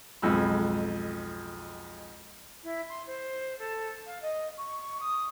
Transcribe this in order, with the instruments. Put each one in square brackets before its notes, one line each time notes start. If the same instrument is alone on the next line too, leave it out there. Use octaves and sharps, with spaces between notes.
[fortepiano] B1 F2 G#2 B5 E6
[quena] E4
C6
C5
A4
F5
D#5
C#6
D#6